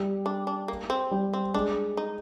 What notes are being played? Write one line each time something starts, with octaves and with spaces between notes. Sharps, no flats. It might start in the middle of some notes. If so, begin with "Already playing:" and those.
Already playing: G3
D4
D4
A#3
C4
G3
C4
G#3 D4
D#4